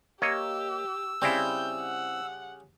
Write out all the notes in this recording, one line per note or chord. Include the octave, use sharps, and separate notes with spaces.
A#3 G4 C#5 D#5 E6
C#3 G3 C4 E4 G6
F#5